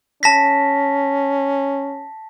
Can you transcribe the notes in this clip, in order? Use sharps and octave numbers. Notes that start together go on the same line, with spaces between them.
C#4 A5 A#6 B6